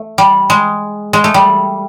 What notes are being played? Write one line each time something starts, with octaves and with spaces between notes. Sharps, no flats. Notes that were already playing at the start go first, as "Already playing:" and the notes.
Already playing: A3
G3
G#3
G#3
A3
G3